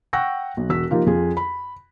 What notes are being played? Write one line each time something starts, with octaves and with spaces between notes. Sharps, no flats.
F#5 G5 C#6 E6 F#6 A#6
B1
E1 F#4 E6 B6
F3 A#3 D#4 F4 G4
F2 F4 G#4
B5